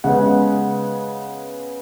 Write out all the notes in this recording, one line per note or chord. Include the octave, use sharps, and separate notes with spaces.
C#3 G#3 B3 F#5